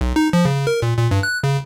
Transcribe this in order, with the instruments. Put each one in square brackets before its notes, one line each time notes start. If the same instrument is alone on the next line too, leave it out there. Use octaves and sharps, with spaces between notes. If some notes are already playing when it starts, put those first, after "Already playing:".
[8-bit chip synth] B1
D#4
F3
C#3
A#4
A#2
A#2
G2
F#6
C#3